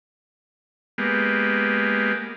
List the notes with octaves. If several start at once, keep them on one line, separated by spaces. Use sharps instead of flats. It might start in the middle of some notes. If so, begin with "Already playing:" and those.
G#3 A#3 B3 G4